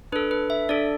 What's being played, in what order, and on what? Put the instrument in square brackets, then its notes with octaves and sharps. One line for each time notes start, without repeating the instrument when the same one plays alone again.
[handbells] D4 B4
A4
B4
E5
D4 A4 D5